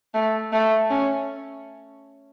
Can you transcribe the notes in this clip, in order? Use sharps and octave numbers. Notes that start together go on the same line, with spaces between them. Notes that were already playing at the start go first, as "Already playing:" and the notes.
A3
A3
C#4